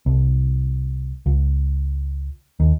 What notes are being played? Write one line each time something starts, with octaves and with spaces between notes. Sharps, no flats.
C2
C#2
D#2